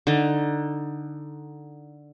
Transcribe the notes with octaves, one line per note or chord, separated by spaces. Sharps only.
D3 D#4